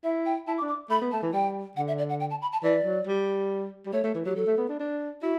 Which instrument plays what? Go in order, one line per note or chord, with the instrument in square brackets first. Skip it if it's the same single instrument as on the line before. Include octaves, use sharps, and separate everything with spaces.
[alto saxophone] E4 [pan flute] E5
[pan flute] G5
[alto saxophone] E4 [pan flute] A5
[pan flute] D6
[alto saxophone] D4
[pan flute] D6
[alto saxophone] A3 [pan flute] B5
[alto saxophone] B3
[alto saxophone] A3 [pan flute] A5
[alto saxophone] E3
[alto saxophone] G3 [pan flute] G5
[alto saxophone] D3 [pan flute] F#5
[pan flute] E5
D5
F#5
G5
A5
B5
A5
[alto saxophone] E3 [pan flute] D5
[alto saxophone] F#3
G3
G3
[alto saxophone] A3 [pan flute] C#5
[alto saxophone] A3
E3
[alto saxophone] F#3 [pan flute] G4
[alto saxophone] F#3 [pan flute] A4
[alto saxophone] A3
B3
D4
D4
[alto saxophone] E4 [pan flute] F#4